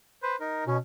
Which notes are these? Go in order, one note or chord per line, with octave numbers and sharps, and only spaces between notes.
B4 C5
D#4 A#4
B2 C#4